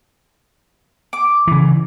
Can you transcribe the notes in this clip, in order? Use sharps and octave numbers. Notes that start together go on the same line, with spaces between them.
D6
C#3 E3